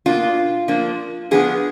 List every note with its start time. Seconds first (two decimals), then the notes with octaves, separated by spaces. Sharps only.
0.06 B2 A#3 D4 F4
0.68 F3 A#3 D4
1.31 F3 B3 D4 G#4